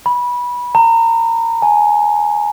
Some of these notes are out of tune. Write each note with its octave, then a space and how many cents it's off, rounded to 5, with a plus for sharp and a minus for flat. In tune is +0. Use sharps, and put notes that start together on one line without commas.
B5 -20
A#5 -30
G#5 +10